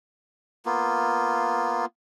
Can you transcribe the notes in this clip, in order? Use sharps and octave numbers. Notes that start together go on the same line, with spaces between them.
A#3 B3 F4